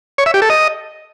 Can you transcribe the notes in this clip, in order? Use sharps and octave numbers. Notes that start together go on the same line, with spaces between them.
C#5
E5
G4
A4
D#5